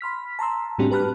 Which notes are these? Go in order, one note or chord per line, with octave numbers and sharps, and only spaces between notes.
B5 C6 F6 B6
A5 A#5 C6 E6
A2 G3 C4 D4 F#4 G4
G4 B4 A5 B5 F6 F#6